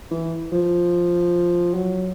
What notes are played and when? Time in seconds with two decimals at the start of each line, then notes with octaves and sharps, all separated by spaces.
0.11 E3
0.52 F3
1.74 F#3